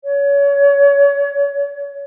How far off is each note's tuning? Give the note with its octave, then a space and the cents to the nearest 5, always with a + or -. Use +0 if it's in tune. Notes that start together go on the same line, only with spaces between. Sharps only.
C#5 +30